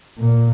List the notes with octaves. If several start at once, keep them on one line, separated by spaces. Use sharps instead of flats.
A#2